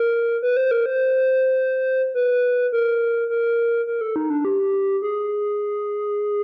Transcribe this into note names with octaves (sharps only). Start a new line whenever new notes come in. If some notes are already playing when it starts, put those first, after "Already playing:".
Already playing: A#4
B4
C5
A#4
C5
B4
A#4
A#4
A#4
A4
D#4
D4
G4
G#4